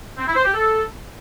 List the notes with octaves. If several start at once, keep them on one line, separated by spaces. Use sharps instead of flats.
C4
E4
C5
G4
A4